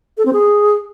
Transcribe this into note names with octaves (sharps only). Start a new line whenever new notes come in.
A4
C4
G#4